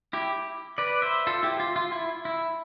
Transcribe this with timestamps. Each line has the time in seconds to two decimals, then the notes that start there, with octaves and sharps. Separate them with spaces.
0.13 E4 G4
0.78 B4 D5
1.02 C5 E5
1.27 F4 A4
1.43 E4 G4
1.60 F4
1.76 F4
1.92 E4
2.25 E4